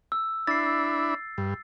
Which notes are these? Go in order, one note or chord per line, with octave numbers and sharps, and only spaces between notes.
E6
D4 E4 B5 A6 C7
G2